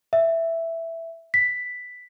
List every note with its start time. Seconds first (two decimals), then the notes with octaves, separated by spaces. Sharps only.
0.13 E5
1.34 B6